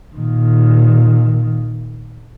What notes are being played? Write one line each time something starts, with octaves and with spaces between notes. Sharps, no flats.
A#2 D#3